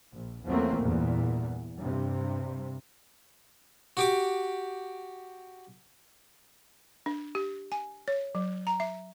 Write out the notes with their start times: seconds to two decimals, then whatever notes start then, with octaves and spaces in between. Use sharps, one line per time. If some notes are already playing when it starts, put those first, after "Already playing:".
0.13 A#1
0.46 E2 F3 F#3 A3 A#3 C4
0.80 E2 G2 A#2
1.79 G2 C3
3.97 F#4 G4 D6
7.06 D4
7.35 G4
7.72 G#5
8.08 C#5
8.35 F#3
8.67 A#5
8.80 E5